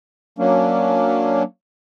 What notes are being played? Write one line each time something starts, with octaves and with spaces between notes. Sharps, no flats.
F#3 A#3 C#4 D4